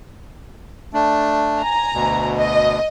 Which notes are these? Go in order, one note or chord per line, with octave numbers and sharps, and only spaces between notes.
A3 D4
G#5 A#5
D2 B2
D#5